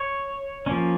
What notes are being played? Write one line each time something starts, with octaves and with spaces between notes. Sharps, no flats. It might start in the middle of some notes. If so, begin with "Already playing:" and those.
Already playing: C#5
F3 A#3 C#4